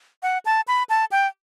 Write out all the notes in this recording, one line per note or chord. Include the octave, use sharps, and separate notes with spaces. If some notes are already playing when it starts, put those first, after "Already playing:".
F#5
A5
B5
A5
G5